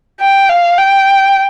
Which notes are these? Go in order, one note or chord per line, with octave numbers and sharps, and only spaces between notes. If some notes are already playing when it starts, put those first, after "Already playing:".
G5
F5
G5